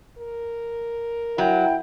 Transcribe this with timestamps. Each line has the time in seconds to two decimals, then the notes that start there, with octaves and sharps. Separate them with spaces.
0.18 A#4
1.38 F#3 E4 G5